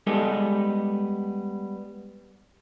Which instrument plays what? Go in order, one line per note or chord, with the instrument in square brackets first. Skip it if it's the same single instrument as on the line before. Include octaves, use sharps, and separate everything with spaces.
[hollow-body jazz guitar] G3 G#3 B3 D#4 G4 A4